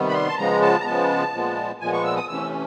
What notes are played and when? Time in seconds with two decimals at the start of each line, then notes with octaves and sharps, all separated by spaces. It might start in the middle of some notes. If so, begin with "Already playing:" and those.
Already playing: C3 D#3 G3 B3
0.09 B5
0.14 C6
0.29 A5
0.38 C#3 F3 G#3 B3 A#5
0.62 A5
0.81 A#5
0.85 C#3 F3 G#3 B3 A5
1.33 A#2 F3 G#3 B3
1.80 A#2 F3 G#3 B3 G#5
1.93 C#6
2.04 E6
2.16 D#6
2.28 C3 E3 A3 C#4 E6